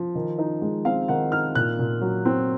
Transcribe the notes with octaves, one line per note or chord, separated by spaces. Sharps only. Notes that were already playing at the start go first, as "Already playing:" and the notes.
Already playing: F3
D#3
D#4
G#3
C4 F5
D#3 F#5
D#4 F6
A#2 F#6
A#2
F#3
C4